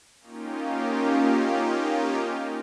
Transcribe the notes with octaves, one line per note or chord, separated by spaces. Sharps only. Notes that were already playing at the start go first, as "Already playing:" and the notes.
A#3 C#4 D#4 F4 G4